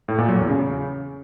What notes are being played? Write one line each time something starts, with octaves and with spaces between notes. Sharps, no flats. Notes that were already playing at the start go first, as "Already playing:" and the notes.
A2
A#2
F#3
E2
C#3